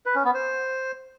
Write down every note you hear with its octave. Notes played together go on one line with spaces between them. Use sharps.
B4
C#4
B3
C5